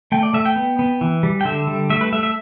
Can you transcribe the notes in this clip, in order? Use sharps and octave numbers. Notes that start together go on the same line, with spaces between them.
A3 G5
D5
A3 E5
G5
B3
B3
E3
G3
G5
D3 E5
G3
A3 E5
B4
A3 E5
E5